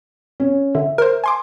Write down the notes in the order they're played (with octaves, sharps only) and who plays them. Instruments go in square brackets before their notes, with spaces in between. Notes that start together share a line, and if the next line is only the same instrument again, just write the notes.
[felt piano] C#4
[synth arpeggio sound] D3 [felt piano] E5
[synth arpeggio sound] A#4 C5
G#5 C6 D6